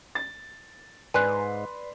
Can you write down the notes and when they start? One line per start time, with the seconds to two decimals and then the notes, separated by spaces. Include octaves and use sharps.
0.15 A6
1.14 G#2 B4 D5 G#5 C6 F#6